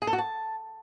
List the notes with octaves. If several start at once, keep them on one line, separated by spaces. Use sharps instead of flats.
G#4
A4
F#4
A5